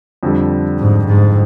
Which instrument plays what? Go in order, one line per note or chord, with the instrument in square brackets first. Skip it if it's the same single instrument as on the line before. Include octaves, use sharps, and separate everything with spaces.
[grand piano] F2 D3 G3
[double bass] G#2
G#2